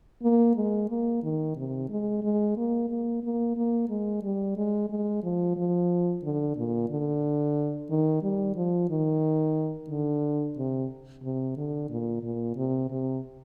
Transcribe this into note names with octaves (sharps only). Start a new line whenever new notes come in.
A#3
G#3
A#3
D#3
C3
G#3
G#3
A#3
A#3
A#3
A#3
G#3
G3
G#3
G#3
F3
F3
D3
A#2
D3
D#3
G3
F3
D#3
D3
C3
C3
D3
A#2
A#2
C3
C3